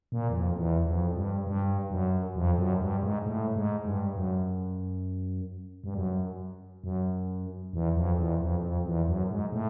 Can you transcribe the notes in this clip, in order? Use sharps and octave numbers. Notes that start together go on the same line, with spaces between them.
A#2
E2
F2
E2
F2
G2
G2
F#2
F2
F#2
G2
G#2
A2
G#2
G2
F#2
G2
F#2
F#2
E2
F2
E2
F2
F2
E2
F#2
G#2
A2